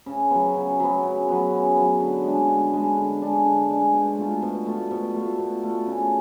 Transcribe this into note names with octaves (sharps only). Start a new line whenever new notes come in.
C#3
F#3 B3
C#3
F#3 B3
C#3
F#3 B3
C#3
F#3 B3
D3
G#3 D4
D3
G#3 D4
D3
G#3 D4
D3
G#3 D4
B2
A3 F4
B2
A3 F4
B2
A3 F4
B2
A3 F4
C#3